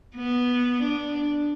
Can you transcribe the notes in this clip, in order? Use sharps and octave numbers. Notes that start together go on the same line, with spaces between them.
B3
D4